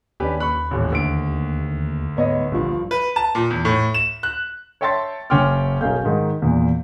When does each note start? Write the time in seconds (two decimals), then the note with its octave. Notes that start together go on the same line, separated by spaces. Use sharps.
0.20 D#2 C#4 D4 G4 B4
0.40 B5 C#6 F#6
0.71 D#1 A1
0.92 D2 D7
2.17 G#2 B3 C#5 D#5
2.52 A#1 G2 F3
2.91 B4
3.16 A5
3.35 A#2
3.50 E2
3.65 A2
3.94 E7
4.23 F#6
4.81 C#5 E5 G5 A5 C6 A6
5.30 F#1 C#4 G5 C6 D6 F6
5.81 B1 C#4 G#4 A#4 F5 G6
6.05 G#2 D#3
6.42 E2 A#2